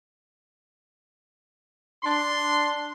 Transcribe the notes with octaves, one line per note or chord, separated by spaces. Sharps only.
D4 C6